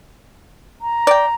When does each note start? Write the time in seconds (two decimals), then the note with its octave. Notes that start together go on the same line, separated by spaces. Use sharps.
0.81 A#5
1.07 D5 G5